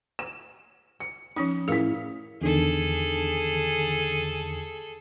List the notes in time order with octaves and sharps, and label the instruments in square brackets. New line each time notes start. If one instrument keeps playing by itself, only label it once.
[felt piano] E7
C#7
[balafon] F3 C#4 D#4 [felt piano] D#6
[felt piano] A1 E4 B6 [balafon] G#4 A#4 F5
[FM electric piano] E2 D3 D#3 [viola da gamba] G#4 A4